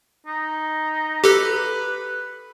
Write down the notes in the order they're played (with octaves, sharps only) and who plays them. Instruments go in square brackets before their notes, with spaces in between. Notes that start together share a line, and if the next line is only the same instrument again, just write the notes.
[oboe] D#4
[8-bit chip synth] G4 A4 [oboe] B4